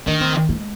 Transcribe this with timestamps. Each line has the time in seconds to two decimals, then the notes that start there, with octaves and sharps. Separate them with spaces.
0.07 D#3 D4
0.21 C4
0.49 G#3